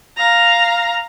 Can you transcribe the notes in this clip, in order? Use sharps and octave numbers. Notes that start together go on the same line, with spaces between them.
F5 A#5